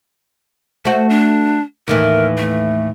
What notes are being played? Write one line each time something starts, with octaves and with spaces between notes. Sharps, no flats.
A3 F#4 C5
D4
D#2 A2 E3 A#4
A3